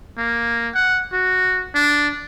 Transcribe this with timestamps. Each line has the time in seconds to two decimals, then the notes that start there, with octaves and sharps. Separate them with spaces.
0.18 A#3
0.75 F#5
1.13 F#4
1.75 D4